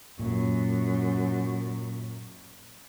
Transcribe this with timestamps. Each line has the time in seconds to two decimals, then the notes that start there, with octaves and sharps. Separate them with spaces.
0.19 F#2 A#2